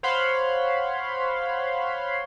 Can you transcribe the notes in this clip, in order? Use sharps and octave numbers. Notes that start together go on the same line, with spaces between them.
C5 C#5 F5 F#5 B5 C6